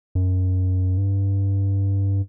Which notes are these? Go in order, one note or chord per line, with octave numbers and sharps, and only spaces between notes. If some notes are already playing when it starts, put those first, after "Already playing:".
F#2
G2